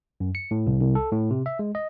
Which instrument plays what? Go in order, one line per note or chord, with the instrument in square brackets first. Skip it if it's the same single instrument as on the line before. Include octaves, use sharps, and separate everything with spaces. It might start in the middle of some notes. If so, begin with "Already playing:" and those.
[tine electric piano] F#2
C#7
A2
C2
C2
A4
A2
C3
E5
G#3
D#5